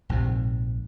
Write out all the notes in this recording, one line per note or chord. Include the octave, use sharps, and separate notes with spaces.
A#1 G#2 C3